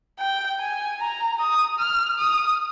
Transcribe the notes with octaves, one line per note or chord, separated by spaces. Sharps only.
G5
G#5
A#5
D#6
F6
D#6